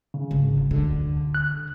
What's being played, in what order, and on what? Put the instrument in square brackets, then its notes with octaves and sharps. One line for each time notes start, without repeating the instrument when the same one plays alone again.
[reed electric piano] C#3
[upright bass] G#1
[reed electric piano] D2 [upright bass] D3
[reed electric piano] F#6